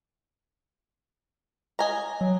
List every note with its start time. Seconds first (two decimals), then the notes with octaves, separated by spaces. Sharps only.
1.79 D#5 G#5 A#5
2.21 F#3